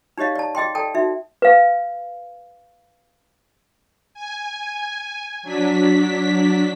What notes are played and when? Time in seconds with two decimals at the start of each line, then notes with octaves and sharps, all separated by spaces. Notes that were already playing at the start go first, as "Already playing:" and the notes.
0.18 D#4 G4 C#5 D#5 F5
0.36 D5 A5
0.55 G#4 D#5 G5 C6
0.75 A4 D5 G5 A5
0.94 D#4 F#4 E5
1.42 B4 F5
4.14 G#5
5.43 F#3 D4 B6